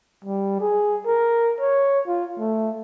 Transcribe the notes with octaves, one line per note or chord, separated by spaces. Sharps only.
G3
G#4
A#4
C#5
F4
A3